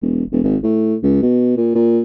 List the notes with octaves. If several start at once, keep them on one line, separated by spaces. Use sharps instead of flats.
E1
E1
G#1
A2
C#2
B2
A#2
A#2